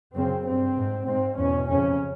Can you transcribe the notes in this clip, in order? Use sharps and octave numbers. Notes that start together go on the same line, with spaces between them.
F#2 C#3 C4
G2 C4
G#2
G#2 C4
E2 B2 C#4
F2 C#3 C#4